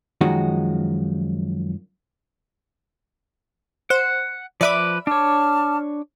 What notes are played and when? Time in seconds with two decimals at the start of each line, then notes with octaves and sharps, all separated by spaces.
0.21 F#2 D#3 F3 G#3 D#4 F#4
3.90 C5 F#5
4.61 F3 B4 D5 E5 B5 D6
5.07 D4 C#5 A5 D6 F6